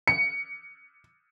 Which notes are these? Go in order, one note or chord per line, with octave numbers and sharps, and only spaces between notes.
C#7